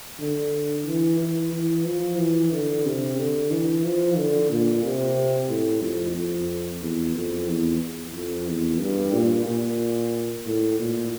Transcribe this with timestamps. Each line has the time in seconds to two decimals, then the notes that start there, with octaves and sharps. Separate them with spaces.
0.20 D3
0.86 E3
1.19 E3
1.53 E3
1.85 F3
2.18 E3
2.52 D3
2.85 C3
3.18 D3
3.51 E3
3.84 F3
4.17 D3
4.51 A#2
4.84 C3
5.49 A2
5.82 F2
6.16 F2
6.81 E2
7.15 F2
7.48 E2
8.14 F2
8.47 E2
8.80 G2
9.13 A#2
9.46 A#2
10.46 A2
10.80 A#2